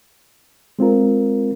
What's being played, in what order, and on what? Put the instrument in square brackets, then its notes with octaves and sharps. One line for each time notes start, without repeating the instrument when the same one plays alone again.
[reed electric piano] G#3 C4 F4 A#4